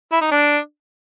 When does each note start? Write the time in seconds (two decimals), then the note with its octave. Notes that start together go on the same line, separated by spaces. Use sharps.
0.12 E4
0.21 D#4
0.31 D4